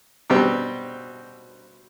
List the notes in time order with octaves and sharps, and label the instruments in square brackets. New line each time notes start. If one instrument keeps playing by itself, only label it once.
[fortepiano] B2 G3 C4 G4